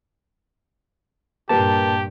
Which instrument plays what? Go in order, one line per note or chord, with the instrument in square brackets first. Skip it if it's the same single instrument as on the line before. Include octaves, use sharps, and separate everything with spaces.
[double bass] G2 A#2 [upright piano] G3 A#3 B4 [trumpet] G4 [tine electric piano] A5